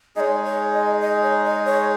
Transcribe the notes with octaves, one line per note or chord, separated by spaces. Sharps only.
G#3 D#4 G#4 C#5 D#5
C#5
D#5
D#5
C#5
D#5
C#5